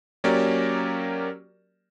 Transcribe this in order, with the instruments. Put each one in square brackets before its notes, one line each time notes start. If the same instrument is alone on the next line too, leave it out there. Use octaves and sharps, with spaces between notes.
[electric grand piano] F#3 A#3 C#4 G4 A#4 D5